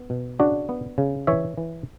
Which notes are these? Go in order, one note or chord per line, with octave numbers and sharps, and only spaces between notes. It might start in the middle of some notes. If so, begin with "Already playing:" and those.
Already playing: B3
B2
C#3 D4 F#4
B3
C#3
E3 C#5 E5
E3